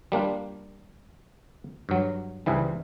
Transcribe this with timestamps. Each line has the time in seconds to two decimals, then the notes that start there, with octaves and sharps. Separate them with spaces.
0.12 G3 A#3 D4 F4
1.89 G2 F#3
2.46 C#2 G#2 E3 G3